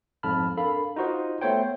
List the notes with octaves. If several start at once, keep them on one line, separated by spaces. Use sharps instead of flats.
F2 G#2 A5 B5 F6
D4 A4 A#4 F5 B5
D#4 F4 F#4 C5 D#5
A3 B3 C5 C#5 G5